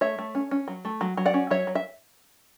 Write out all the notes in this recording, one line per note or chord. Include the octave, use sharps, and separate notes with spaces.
A3 C#5 E5
A3
C#4
C#4
F#3
A3
F#3
F#3
D5 F#5
C#4
F#3 C#5 E5
F#3
E5